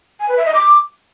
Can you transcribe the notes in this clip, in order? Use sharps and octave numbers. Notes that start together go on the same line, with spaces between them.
G#5
B4
E5
D#5
D6